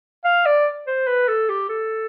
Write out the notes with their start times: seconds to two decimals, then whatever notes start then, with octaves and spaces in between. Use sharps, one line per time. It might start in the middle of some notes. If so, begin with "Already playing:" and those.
0.24 F5
0.46 D5
0.87 C5
1.07 B4
1.28 A4
1.49 G4
1.69 A4